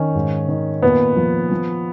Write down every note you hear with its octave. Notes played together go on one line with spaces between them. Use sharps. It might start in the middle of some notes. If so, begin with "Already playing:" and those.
Already playing: D#3 C#4
G#2
D#3
A#2 B3
F3
F3